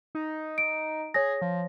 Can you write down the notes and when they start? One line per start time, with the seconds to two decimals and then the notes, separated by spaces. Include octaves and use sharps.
0.15 D#4
0.58 D7
1.14 G#4 C#5 A#6
1.42 F3